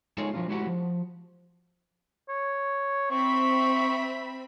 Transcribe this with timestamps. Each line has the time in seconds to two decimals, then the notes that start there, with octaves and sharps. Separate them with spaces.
0.18 G#3 D#4 F4 G#4 A4 C#5
0.34 F3 F#3 D4 F4
0.48 G#3 A3 E4 F#4 G4 F#5
0.67 F3
2.29 C#5
3.11 C4 E5 B5 C#6